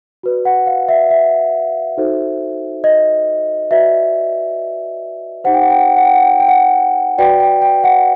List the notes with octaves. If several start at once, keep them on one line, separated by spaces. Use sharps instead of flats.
F#4 B4 D5
F#5
F5
E5
E5
D#4 F#4 A4 C5
D#5
F#4 B4 D5 E5
D#4 G4 C5 F#5
G5
F#5
G5
F#5
G5
F#5
G5
F#5
G5
F#5
G5
F#5
F#4 B4 D5 G5
G5
G5
F#5